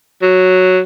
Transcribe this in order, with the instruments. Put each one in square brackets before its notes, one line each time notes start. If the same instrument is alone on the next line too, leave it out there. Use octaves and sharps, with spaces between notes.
[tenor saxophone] F#3